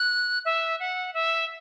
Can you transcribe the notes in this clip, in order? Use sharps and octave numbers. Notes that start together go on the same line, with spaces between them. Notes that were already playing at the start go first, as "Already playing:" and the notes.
Already playing: F#6
E5
F#5
E5